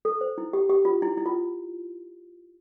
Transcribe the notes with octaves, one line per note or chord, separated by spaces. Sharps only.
A4
C5
E4
G4
G4
F4
E4
E4
F4